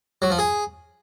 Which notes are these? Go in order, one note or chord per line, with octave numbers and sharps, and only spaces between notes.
F#3
F3
G#4